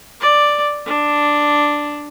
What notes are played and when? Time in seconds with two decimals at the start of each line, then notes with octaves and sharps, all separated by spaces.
0.21 D5
0.86 D4